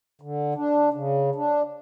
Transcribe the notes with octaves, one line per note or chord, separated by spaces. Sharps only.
D3
D4
C#3
D4